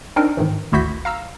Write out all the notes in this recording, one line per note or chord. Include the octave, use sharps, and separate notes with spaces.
C4 D4 D#4 A#4
G#2 D#3 E3
G#1 D2 E4 F#4 G6 B6
F5 A#5 E6